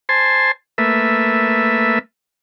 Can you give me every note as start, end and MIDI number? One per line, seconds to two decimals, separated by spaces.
0.09 0.51 72
0.09 0.51 80
0.09 0.51 81
0.09 0.51 84
0.78 1.99 57
0.78 1.99 58
0.78 1.99 71
0.78 1.99 76